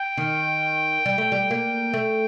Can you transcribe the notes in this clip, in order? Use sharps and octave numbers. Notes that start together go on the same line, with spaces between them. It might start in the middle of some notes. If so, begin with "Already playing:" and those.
Already playing: G5
D#3
G3
A3
G3
A#3
A3